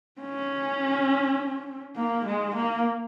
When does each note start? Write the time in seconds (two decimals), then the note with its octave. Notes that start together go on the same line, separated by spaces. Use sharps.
0.21 C#4
1.96 A#3
2.26 G#3
2.55 A#3